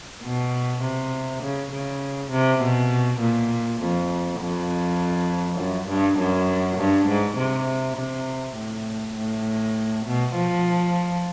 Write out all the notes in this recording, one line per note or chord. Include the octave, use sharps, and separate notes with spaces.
B2
C3
C#3
C#3
C3
B2
A#2
F2
F2
F#2
G2
F#2
G2
G#2
C3
C3
A2
A2
B2
F3